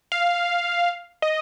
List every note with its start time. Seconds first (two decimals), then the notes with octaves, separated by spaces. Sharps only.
0.12 F5
1.22 D#5